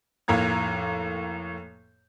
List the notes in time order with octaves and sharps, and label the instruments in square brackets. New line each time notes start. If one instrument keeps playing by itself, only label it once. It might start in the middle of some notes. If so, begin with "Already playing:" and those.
[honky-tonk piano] F1 A2 A#3 A#5 G#6